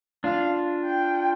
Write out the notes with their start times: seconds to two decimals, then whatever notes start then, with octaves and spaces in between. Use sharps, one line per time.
0.24 D4 F4 F5
0.86 G5